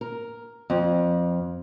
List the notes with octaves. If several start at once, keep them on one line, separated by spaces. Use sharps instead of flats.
A#4
F2